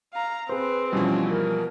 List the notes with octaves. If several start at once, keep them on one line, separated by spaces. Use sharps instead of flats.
F5 A#5
C4 G#4 B4 C5
B2 E3 F3 G3 C#4
A#4